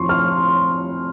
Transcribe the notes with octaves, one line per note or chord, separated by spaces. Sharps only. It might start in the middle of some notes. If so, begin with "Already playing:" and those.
Already playing: F2 F3 C4 C6 C#6
F6